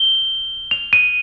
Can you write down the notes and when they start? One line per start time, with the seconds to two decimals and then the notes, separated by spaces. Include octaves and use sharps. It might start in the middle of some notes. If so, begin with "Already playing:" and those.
Already playing: G7
0.71 F7
0.93 D#7